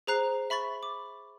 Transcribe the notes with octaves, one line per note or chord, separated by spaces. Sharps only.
G#4 C5 A#5 F#6 C7
E5 B5 C#6 A6 F#7
D6